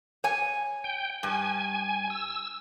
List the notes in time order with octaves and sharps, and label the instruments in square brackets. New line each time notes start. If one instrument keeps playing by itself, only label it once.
[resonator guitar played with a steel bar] C#5 G#5
[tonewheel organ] G5
[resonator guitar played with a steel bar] G2 [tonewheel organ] G#5
[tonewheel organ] E6